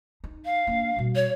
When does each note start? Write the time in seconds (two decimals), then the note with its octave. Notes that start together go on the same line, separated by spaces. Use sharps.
0.24 D#4
0.45 F5
0.67 A#3 D4
0.96 B2 G3
1.16 C#5